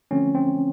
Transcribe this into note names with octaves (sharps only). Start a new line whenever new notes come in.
D3 F3 A3 C4 C#4
C4